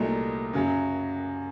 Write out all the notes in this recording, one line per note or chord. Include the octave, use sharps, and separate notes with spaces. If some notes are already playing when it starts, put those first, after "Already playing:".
Already playing: C2 A#2 F#3 A3 D#4
F#2 C#3 F#3